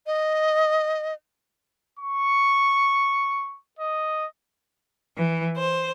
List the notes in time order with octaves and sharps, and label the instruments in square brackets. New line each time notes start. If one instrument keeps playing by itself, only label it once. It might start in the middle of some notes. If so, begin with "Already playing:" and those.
[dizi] D#5
[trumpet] C#6
D#5
[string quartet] E3
C5